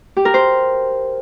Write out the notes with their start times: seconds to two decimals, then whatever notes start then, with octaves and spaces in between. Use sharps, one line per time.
0.17 G4
0.25 A#4
0.34 C5